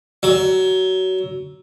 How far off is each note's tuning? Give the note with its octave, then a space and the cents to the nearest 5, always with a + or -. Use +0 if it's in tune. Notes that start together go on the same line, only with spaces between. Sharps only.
F#3 +20